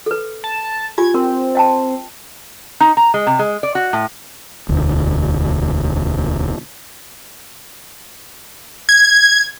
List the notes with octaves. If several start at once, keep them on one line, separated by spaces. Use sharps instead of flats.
A4 B4
A5
F4 G4 G#5 G#6
C4 A#4
D#5 G5 A5
D#4
A#5
G#3
C3
G#3
D5
F#4
A2
E1 D2
G#6